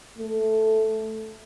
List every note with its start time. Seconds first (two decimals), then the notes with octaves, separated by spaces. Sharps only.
0.19 A3